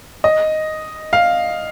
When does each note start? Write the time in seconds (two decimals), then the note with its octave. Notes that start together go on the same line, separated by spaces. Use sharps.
0.24 D#5
1.13 F5